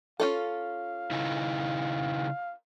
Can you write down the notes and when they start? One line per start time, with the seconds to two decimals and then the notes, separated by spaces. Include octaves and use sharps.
0.20 C#4 F4 A4 F5
1.11 C#3 D#4 E4